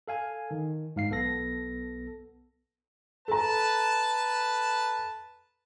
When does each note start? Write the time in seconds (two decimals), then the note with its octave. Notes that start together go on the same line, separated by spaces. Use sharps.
0.08 A4 F5 G#5
0.51 D#3
0.96 G#2 F5 C7
1.10 B1 B3 A4 A#6
3.28 A4 B4 A5 A#5